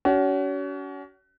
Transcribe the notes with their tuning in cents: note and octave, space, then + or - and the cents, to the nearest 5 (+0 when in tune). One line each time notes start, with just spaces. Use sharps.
C#4 +35 F#4 +35